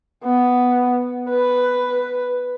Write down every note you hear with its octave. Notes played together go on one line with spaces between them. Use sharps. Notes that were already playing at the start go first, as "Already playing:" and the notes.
B3
B4